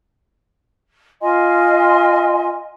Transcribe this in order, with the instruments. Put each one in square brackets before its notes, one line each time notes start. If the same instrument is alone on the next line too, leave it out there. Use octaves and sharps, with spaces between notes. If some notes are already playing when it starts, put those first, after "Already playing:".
[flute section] F4 D#5 G#5 C6